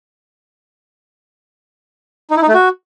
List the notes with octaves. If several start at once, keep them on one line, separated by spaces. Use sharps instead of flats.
D#4
E4
D#4
A3
F#4